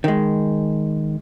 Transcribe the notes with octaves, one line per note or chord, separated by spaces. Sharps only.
D#3 G#3